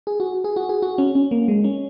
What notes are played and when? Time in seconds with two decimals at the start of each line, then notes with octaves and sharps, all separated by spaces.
0.07 G#4
0.20 F#4
0.44 G#4
0.56 F#4
0.69 G#4
0.82 F#4
0.98 C#4
1.15 C#4
1.31 A#3
1.48 G#3
1.64 C#4